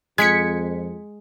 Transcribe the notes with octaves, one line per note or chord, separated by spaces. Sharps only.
F2 G#3 G#6 B6 C#7